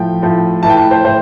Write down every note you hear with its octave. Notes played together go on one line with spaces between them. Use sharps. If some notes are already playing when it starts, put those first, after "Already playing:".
Already playing: A2 F3 G5
A2 F3
A2 E3 A5
G5
A5
C5
A2 C5